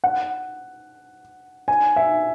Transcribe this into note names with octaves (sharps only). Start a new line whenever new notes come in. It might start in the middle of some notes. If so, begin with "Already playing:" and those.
F#5
G#5
E5